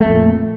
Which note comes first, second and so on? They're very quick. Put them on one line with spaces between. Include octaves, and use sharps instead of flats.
A3 F2 A#2